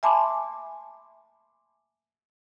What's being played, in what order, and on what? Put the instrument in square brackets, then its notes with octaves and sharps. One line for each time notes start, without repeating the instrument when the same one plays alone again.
[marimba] E5 G#5 A5 B5 C6 D6